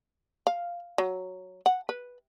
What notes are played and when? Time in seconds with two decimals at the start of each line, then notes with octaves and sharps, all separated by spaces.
0.47 F5
0.98 F#3
1.66 F#5
1.89 B4